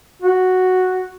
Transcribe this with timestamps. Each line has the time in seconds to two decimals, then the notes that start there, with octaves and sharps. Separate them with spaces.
0.22 F#4